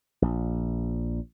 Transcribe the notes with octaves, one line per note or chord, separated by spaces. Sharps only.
A#1